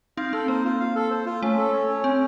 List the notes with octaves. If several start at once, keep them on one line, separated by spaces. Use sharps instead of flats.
C4 D#4 F5
C4 A4
A#3 C5
F4
F5
A4
C5
F4
A3 C#4
A4
C#5
C#4
C4 C#4